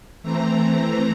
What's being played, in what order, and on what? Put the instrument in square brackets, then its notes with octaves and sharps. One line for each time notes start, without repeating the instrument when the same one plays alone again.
[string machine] E3 A3 C4 A#5